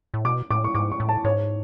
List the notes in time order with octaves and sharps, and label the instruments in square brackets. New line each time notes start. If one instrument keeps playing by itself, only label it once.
[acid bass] A2
[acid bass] B2 [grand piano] D6
[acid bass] A2 [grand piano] D6
[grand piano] C#6
[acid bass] G#2 [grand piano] D6
[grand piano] C#6
[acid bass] A2
[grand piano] A5
[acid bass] G#2 [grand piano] C#5